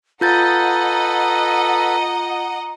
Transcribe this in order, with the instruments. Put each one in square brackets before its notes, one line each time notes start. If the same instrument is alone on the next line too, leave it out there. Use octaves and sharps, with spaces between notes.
[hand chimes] F4 G6 A6 [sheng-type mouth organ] A4 B4 [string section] D#5 F#5 [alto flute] A#5